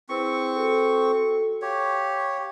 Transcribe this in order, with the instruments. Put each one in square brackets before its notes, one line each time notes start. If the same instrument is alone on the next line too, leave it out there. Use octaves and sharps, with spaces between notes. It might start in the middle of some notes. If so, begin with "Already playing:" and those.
[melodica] C4 C#6 [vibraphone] E4 G#4 B4
[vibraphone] F#4 A4
[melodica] G4 C#5 [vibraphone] F5 C#6